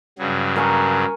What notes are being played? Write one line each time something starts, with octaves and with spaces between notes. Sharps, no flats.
G2 C#3 F#3
A#4 G#5 C#6